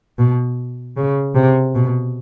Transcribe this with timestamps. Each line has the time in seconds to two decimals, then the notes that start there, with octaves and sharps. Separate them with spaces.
0.19 B2
0.97 C#3
1.35 C3
1.75 B2